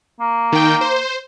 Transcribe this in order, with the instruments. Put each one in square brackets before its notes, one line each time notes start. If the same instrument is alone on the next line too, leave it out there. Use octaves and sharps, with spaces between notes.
[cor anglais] A#3
[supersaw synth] D#3 G5
C5